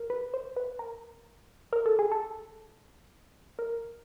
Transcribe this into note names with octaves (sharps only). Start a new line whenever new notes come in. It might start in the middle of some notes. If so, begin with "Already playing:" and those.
Already playing: A#4
B4
C5
B4
A#4
A#4
A4
G#4
A4
A#4